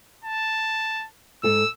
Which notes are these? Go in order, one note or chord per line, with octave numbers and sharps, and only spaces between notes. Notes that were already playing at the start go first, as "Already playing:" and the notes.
A5
G#2 A4 A5 E6